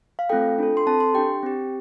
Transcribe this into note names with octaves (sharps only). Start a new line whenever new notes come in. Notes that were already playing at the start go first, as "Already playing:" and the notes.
F5
A3 C4 F4 A4 G5
D4 F4 A4
C6
C4 A4 A5
C6
D4 G4 G5
C4 G4